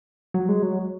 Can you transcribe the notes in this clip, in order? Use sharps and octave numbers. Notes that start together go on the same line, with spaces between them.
F#3
G#3
F#3